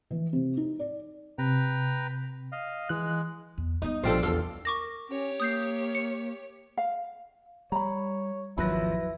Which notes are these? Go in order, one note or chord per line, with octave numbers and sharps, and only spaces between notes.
E3
C3
D#4
D5
C3 B4 G5 A#5
D#5 F5
E3 G#3 F#6
E2
G3 B3 D#4
A#1 F3 D4 F4 G4 A4 C5
E2 C#3 F4 A4
A#4 C#6 D6 A#6
C#4 G4 C#5
A#3 D#6 G6 C7
C#7
F5
G3 C#5 A#5 B5
G#1 D#2 F3 F#3 E4 B4 B5 A#6